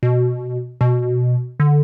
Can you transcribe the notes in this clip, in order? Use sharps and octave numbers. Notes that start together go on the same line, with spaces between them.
B2
B2
D3